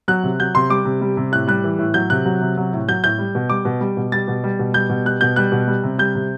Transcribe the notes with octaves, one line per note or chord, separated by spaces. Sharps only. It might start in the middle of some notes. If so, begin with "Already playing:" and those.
F#3 F#6
C3
F#3 G6
C3 C6
G3 D6
C3
G3
C3
A2 F#6
G3 F#6
E3
A2
F#3 G6
C3 F#6
F#3
C3
F#3
A2
F#3 G6
A2 G6
G3
B2
G3 D6
B2
G3
B2
G3 A6
B2
G3
B2
G3 G6
B2
G3 F#6
B2 G6
G3 F#6
B2
G3
C3
G3 G6
C3